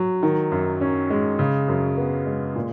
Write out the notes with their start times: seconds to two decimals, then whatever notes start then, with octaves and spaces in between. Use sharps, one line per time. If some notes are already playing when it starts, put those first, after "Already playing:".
Already playing: F#3
0.23 D#3
0.52 F#2
0.81 C#4
1.10 G#3
1.39 C#3
1.68 F#2
1.97 B3
2.26 G#3
2.55 A#2